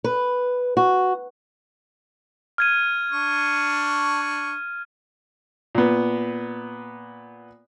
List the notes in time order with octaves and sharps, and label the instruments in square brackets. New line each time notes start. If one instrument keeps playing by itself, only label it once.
[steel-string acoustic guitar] B4
F#4
[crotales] F6 G#6 D#7
[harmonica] D4 C#6
[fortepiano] A#2 B3